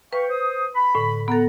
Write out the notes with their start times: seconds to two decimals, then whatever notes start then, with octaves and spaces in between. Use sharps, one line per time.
0.13 B4 F5 G5 C#6
0.29 C5 D#6
0.75 B5
0.95 A2 D3
1.28 B3 A4 F#5 A#5